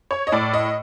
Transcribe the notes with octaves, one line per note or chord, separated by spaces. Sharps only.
C#5
D#5
A2 D5
D#5